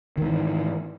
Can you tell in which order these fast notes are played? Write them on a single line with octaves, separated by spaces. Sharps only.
D#3 G#2 E3